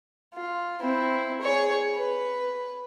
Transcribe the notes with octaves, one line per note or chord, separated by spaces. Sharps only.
F4
C4 E4
G#4 C#5
B4